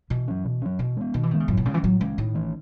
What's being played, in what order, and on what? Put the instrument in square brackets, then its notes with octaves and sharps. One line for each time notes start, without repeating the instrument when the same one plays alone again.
[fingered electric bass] B2 [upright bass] E3
[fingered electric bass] F#3 C#4
B2
F#3 C#4
[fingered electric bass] B2 [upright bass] E3
[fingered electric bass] G#3 B3
[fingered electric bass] B2 [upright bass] D#3
[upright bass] E3
[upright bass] D#3 [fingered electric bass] G#3 B3
[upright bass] C#3
[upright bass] F#2 [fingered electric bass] A2
[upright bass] B2
[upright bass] C#3 [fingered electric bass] G#3 C#4
[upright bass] E3
[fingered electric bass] A2 [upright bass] F#3
[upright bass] E3 [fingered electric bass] G#3 C#4
[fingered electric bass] A2 [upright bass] D#3
[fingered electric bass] E3 A3 C#4